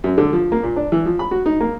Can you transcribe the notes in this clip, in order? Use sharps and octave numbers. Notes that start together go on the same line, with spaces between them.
F#2
D3
F3
A#3
A#2
D4
E3
F3
B5
F#4
D#4
A#3